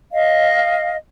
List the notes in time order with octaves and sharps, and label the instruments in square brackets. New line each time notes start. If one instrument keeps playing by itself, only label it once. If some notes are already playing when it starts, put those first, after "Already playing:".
[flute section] D#5 F5